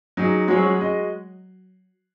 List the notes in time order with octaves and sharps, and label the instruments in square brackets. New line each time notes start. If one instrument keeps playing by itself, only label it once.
[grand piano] F#3 D#4 G#4
[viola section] F#3 [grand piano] G#3 C#4 G#4 C#5
[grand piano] G#3 F#4 D#5